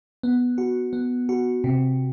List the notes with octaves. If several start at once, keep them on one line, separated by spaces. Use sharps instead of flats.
B3
F#4
B3
F#4
C3